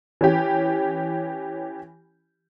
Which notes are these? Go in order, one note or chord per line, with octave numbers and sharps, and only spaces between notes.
E3 C#4 G4